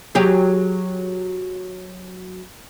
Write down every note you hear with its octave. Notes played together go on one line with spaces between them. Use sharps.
F#3 G4 G#4